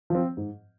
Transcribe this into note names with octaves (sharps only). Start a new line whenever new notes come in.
F3 C4
G#2